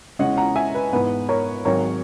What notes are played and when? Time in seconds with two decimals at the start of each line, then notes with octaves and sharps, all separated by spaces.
0.19 E2 C#3 G#3 C#4 D#5 F#5
0.37 F#5 A#5
0.56 E5 G#5
0.74 B4
0.93 G#2 E3 B3 B4
1.29 A#4 C#5
1.65 G#1 G#2 F#3 A#4 C#5